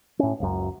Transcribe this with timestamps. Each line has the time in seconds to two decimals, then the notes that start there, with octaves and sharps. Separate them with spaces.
0.19 A2 C#4
0.40 F#1 C#2 F#2